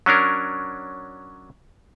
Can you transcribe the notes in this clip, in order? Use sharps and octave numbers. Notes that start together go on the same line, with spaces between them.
F#3 C#4 D4 A#4